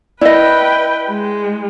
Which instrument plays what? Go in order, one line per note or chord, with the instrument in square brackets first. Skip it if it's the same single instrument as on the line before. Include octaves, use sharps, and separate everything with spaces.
[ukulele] E4 D#5 [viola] B4 G5 [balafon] D5
[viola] G#3